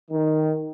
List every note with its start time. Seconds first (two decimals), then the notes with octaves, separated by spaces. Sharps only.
0.11 D#3